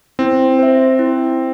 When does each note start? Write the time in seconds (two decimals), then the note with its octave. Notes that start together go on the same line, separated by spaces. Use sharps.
0.19 C4 E4
0.59 C5 E5
0.99 E4